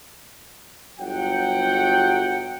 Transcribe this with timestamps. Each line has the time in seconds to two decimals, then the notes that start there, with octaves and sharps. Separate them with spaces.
0.99 G1 F#3 F#5 G5